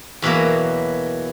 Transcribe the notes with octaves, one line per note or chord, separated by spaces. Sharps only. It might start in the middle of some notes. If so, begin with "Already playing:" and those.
E2 B2 F#3 A#3